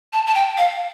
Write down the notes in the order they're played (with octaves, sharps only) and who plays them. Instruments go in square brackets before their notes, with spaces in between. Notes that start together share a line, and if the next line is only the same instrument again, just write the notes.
[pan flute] A5
A5
G5
F5